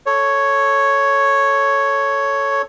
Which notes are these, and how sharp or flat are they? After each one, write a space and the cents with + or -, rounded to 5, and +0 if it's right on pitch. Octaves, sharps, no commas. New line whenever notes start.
A4 +0 C#5 +0